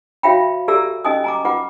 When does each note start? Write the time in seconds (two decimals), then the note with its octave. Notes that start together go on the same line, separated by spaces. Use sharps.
0.23 F#4 C#5 E5 F5 G5 B5
0.68 G4 A4 D5 E5 A#5 E6
1.05 C#4 D#5 G#5 D#6
1.24 G#5 A#5 D6
1.45 F4 B4 F#5 D6